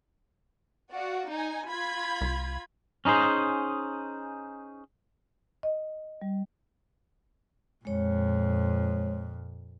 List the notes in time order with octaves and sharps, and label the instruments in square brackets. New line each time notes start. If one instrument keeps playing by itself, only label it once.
[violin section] F#4 D5 F5
D#4 G#5
F4 B5 G#6
[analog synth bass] C2
[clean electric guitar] C#4 D#4 G#4 C5
[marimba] D#5
G3
[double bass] F2 A#2 [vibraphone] G#3 C#5